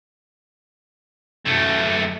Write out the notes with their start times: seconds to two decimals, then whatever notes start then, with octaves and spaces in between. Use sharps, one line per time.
1.46 F#2 A3